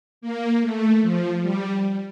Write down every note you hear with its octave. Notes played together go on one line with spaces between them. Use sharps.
A#3
A3
F3
G3